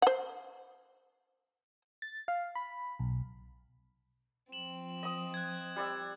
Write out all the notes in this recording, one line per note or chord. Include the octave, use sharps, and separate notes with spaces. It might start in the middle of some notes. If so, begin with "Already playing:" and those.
C5 F#5
A6
F5
B5
B1
F3 C4 E7 F#7
D#5 D#6
F#6 G#6
G3 D5 E6